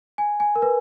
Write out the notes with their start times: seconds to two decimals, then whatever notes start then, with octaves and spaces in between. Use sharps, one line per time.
0.18 G#5
0.40 G#5
0.56 A#4
0.62 B4